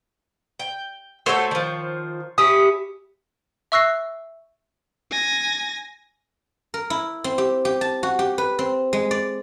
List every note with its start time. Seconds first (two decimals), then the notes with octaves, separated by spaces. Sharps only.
0.59 G5
1.26 A3 F#4 A4 C5 C#5
1.51 D#3 F3
2.38 C#4 E4 G4 D#6
3.72 E5 C#6 E6 F#6 A#6 C7
5.11 G#5 A#6
6.74 A#4
6.90 E4
7.24 C4
7.38 G4
7.65 G4
7.81 A5
8.03 F#4
8.19 G4
8.38 B4
8.59 C4
8.93 G#3
9.11 D5